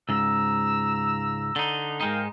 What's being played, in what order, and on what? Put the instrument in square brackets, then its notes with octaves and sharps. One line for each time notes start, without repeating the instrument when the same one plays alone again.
[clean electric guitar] C#2 G#2 [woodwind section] A#5 E6
[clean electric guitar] D3 D#4
[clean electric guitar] G#2 G#3 D#4 [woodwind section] A#4 F5 G5